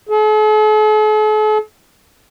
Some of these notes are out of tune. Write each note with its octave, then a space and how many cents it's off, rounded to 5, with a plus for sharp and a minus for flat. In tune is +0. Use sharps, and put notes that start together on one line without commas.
A4 -45